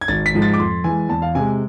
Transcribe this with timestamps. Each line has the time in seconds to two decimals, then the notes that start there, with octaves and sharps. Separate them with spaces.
0.01 G#6
0.08 G#1 A6
0.26 B6
0.34 G#2 F3 G#3
0.42 A6
0.54 D6
0.59 F2 C6
0.84 E3 G#3 G#5
1.09 E2 A5
1.22 F5
1.35 C3 G#3 G#5